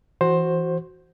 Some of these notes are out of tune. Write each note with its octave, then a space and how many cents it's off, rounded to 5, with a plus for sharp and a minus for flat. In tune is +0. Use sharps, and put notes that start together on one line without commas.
E3 +10 F#4 +0 C5 +15